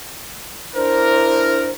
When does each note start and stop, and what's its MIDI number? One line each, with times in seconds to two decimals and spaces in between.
0.75 1.73 62
0.75 1.73 64
0.75 1.73 70
0.75 1.70 72